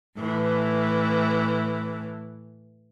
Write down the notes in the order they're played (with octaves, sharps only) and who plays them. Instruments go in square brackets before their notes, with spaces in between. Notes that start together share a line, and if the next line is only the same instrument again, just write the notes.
[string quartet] A2 E3